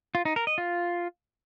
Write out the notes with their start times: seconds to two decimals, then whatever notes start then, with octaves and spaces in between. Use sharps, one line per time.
0.15 F4
0.25 D#4
0.36 A#4
0.47 D#5
0.58 F4